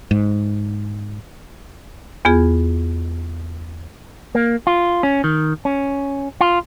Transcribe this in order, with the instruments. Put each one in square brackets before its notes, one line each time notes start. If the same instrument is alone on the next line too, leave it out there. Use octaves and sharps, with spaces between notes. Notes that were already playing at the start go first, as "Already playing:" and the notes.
[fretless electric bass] G#2
[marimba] E2 B3 F4 G#4
[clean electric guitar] A#3
F4
C#4
D#3
C#4
F4